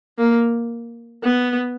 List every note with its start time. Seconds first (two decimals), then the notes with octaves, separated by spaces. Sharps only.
0.18 A#3
1.24 B3